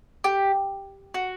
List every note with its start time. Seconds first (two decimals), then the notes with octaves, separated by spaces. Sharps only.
0.24 G4
1.14 F#4